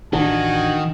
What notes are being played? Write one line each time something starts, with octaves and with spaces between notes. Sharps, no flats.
A1 D#3 D4 F#4 G#5